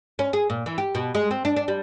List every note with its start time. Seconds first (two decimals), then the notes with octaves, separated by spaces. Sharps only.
0.19 C#4
0.33 G#4
0.50 A#2
0.66 E3
0.78 G4
0.95 B2
1.15 G#3
1.31 C4
1.45 D4
1.56 D4
1.68 G3